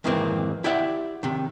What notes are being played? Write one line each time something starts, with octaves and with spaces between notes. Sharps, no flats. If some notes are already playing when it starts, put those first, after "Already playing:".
F2 G#2 D#3 E3 A#3 C4
E4 G4 D5 E5 F#5
C3 D#3